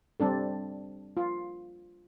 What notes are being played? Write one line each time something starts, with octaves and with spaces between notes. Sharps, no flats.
G3 C4 D4 A4
F4